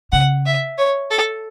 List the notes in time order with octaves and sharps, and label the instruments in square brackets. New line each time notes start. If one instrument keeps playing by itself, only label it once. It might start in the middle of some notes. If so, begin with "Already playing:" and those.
[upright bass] C#3 [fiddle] F#5
[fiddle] E5
C#5
A4